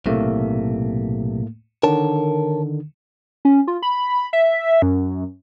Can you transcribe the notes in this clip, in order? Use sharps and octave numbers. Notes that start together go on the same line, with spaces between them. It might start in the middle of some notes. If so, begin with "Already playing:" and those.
B1 A2 C3 A3 A#3
D3 D#3 A#4 C#5 A5
C#4
F4
B5
E5
F#2